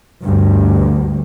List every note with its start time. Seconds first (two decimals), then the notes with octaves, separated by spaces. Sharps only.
0.21 D2 G2